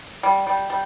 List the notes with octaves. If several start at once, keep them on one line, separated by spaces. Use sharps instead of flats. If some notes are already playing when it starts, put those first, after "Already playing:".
G3
G3
G3